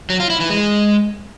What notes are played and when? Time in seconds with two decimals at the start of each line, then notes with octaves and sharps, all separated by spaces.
0.10 F#3
0.20 F4
0.30 E4
0.40 E3
0.50 G#3